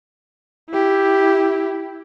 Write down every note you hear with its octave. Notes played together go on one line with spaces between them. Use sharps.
E4 G4